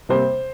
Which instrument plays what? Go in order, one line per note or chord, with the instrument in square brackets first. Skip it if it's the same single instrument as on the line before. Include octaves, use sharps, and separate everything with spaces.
[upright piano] C3 G3 A#3 C5